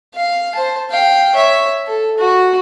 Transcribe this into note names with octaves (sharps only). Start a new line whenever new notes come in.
F5
C5 A5
F5 G5
C#5 E5
A4
F#4